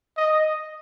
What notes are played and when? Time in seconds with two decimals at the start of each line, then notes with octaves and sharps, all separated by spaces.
0.17 D#5